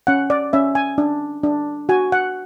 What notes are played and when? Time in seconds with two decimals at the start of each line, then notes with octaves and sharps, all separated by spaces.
0.07 C#4 F#5
0.30 D5
0.53 C#4 E5
0.75 G#5
0.98 D4
1.43 D4
1.89 F#4 G#5
2.12 F#5